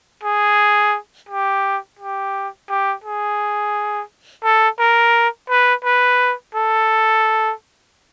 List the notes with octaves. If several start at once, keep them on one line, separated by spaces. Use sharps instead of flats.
G#4
G4
G4
G4
G#4
A4
A#4
B4
B4
A4